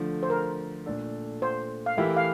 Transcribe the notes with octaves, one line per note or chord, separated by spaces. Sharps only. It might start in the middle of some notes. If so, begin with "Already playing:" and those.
Already playing: D3 F3 A3
C5
A#4
A#2 A3 D4 A4
C5
F5
E3 A3 E4 G4 A#4 E5
F5